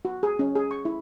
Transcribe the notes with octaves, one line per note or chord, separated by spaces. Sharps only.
F#4
G#4
C#4
G#4
C#6
E4